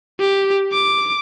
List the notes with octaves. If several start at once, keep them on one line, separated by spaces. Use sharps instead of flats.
G4
D6